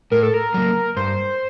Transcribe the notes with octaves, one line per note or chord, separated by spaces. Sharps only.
A2 A#4
A4
A#4
F#3 A#3
G2 C5